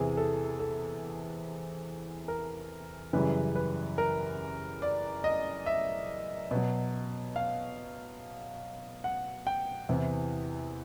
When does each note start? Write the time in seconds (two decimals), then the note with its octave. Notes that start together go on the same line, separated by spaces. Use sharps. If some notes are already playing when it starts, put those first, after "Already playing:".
Already playing: E2 C3 E3 G#4
0.17 A4
0.59 A4
2.28 A#4
3.13 F#2 C#3 E3 G3 B4
3.55 B4
3.98 A#4
4.82 D5
5.24 D#5
5.66 E5
6.51 B2 F#3
7.36 F5
9.04 F#5
9.47 G5
9.89 E2 C3 E3